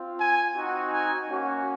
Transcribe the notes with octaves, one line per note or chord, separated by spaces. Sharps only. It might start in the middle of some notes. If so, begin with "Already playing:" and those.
Already playing: C4 F4
G#5
C4 D#4 F#4
G#5
A#3 C#4 F#4